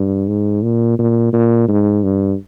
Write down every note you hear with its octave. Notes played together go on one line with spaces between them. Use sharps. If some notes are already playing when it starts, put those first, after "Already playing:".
Already playing: G2
G#2
A#2
A#2
A#2
G#2
G2